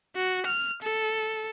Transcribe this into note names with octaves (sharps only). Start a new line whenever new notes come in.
F#4
F6
A4